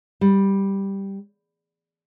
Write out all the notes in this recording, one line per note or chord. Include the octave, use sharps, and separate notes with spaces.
G3